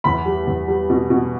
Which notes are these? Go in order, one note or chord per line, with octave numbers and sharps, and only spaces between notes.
E2 B5
G3
E2
G3
B2
B2